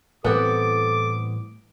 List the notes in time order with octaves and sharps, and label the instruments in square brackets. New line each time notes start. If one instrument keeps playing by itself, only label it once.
[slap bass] A2 E3 G3 [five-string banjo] B3 C4 [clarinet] A4 [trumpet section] D6